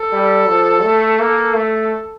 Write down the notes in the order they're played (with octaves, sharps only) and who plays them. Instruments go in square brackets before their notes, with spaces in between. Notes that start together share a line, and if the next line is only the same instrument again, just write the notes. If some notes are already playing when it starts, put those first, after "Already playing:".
Already playing: [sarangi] A4
[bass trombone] G3
F3
A3
A#3
A3